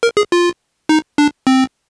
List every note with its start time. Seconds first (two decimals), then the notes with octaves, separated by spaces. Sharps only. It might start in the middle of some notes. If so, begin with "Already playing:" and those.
0.03 A#4
0.17 G#4
0.32 F4
0.89 D#4
1.18 D4
1.47 C4